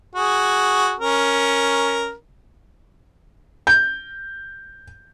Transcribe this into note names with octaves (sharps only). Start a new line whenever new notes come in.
F#4 G#4
C#4 A#4
G6